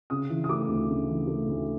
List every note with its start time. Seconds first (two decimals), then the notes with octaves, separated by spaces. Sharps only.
0.10 C#3 D#6
0.30 E3
0.44 D#6
0.49 A3 D6
0.69 D2
0.89 C#3
1.08 E3
1.27 A3
1.48 D2